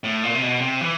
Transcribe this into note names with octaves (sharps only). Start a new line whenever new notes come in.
A2
A#2
C3
B2
C3
E3